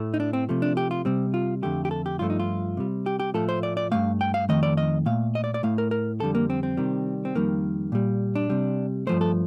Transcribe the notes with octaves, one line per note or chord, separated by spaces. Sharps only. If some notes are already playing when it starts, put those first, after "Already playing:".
Already playing: A2 A3
D#4
D4
C4
C3 F3 A3
D4
G4
F4
C3 G3 C4
F4
F2 D3 A3 G4
G4
A4
G4
G2 F3 A3 F4
D#4
F4
C3 G3
G4
G4
A2 F3 A3 A4
C5
D5
D5
G2 D#3 A3 F5
G5
F5
F2 D#3 A3 D#5
D5
D#5
A#2 A3 F5
D#5
D5
D5
A2 A3 F5
A#4
A#4
F2 D3 G3 A4
A#3
C4
C4
C3 D#3 G3
C4
F2 D#3 G3 A#3
A#2 G3
D4
C3 G3
G2 F3 A3 C5
A4